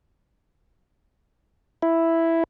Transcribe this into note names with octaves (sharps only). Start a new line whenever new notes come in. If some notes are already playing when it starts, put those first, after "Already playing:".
E4